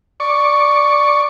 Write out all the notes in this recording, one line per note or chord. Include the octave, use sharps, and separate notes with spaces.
D5 C#6